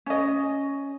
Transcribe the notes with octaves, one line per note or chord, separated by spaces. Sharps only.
C#4 D#5